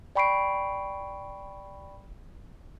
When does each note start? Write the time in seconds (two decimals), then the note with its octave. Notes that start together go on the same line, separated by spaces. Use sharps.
0.15 D5 G5 B5 C#6 C7 D7